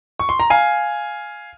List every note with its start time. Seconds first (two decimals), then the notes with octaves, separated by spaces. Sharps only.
0.19 C#6
0.29 C6
0.40 A#5
0.50 F5 G#5